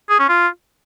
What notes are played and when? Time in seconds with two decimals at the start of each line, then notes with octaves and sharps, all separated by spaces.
0.09 G#4
0.19 C#4
0.29 F4